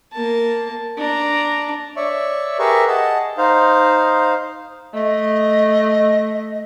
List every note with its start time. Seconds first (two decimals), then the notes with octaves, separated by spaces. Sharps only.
0.13 A#3 A5
0.98 D4 A#5
1.96 C#5 D5 E5 C#6
2.59 G4 G#4 A#4 B4 E5 C#6
2.88 G#4 D#5 F#5 A5
3.38 D#4 C5 F5
4.94 A3 D#5